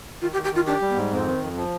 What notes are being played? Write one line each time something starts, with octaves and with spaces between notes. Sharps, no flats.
D#3 F4
G4
D#3
G4
D#3 F4
D4 G4
G3
B3
G#2
F2 C4
D#3
F2
F3